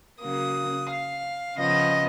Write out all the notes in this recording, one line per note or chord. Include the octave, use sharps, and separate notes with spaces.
C#3 F#3 A#3 D#6
F5
C#3 F3 B3 D#5